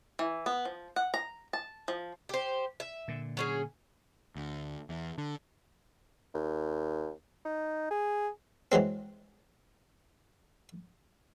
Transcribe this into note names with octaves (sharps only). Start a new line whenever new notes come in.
E3
B3
F3
F#5
A#5
A5
F3
G4 C5
E5
A#2 D3
F#3 C#4 G#4
D2
E2
D3
D#2
D#4
G#4
E3 F#3 G#3 C4